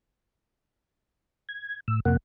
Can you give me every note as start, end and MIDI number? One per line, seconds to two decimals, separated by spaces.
1.49 1.80 92
1.88 2.00 45
1.88 2.00 88
2.05 2.17 41
2.05 2.17 48
2.05 2.17 58
2.05 2.17 78